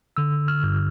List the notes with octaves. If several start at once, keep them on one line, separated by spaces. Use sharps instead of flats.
D3 E6
F6
G2